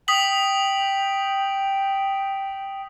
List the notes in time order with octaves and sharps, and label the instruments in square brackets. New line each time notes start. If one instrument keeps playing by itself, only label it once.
[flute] G5 [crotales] D#6 B6 F#7